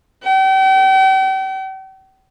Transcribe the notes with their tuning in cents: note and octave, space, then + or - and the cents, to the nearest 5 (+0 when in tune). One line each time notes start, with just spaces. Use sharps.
G5 -40